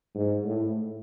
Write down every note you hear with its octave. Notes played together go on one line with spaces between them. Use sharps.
G#2
A2